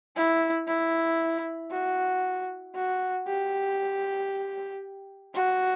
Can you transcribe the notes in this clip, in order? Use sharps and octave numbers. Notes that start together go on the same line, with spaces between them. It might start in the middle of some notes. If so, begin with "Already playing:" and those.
E4
E4
F#4
F#4
G4
F#4